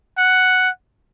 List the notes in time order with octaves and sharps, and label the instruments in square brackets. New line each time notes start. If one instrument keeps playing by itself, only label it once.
[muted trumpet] F#5